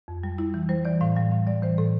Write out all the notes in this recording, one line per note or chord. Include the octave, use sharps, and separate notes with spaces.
F2
G3
G3 E4
E3
G3 C5
E3 D5
A2 F5
G3 F5
A2 F5
G3 D5
E3 C5
A2 A4